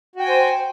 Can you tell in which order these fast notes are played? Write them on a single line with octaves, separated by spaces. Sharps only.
F#4 G5 G#5 C5